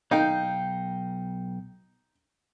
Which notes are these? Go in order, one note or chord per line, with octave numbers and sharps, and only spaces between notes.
B1 D#4 F5 G5